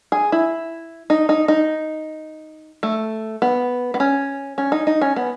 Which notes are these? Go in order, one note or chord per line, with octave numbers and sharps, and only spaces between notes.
G#4
E4
D#4
D#4
D#4
A3
B3
B3
C#4
C#4
D#4
D#4
C#4
B3